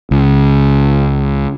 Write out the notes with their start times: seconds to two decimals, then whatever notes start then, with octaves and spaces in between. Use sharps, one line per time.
0.11 C#2